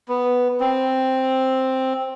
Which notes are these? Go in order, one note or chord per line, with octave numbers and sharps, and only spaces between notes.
B3
C4